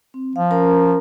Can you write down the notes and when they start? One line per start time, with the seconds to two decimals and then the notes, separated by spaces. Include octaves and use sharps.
0.14 C4
0.36 F3 F5
0.51 C#4 A#4 A#5